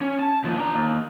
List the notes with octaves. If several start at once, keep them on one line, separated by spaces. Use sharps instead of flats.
C#4
A5
D#2 F3
D4 A#5
D#2